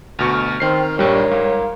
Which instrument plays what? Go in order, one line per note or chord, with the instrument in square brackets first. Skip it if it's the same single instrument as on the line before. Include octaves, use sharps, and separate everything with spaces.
[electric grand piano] D2 B2 C#6 [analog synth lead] F6
[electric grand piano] D#3 C7 [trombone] C4
[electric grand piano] A#1 G2 [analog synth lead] G3 [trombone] A#4 [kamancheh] C#5
[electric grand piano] G#2 [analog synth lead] F5